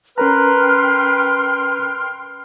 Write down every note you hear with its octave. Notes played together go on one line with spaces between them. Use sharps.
C#4 A#4 B4 G5 A#5 C6 F6